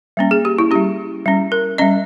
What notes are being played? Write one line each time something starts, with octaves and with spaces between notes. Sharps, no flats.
G3 A#3 C#4
G#4
G4
E4
G3 C#4 G4
G3 C#4
A#4
G3 C#4 D#5